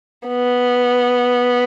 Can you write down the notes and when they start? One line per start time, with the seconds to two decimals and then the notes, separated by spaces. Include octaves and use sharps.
0.28 B3